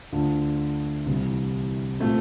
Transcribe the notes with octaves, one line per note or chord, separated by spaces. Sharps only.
D2 D3 A3 D4 F4
C2 C3 E3 G3
A#2 A3 C4